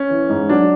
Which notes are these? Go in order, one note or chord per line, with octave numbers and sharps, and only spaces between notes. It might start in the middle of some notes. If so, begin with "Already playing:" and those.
Already playing: C#4
E3
G#2
F#3 D4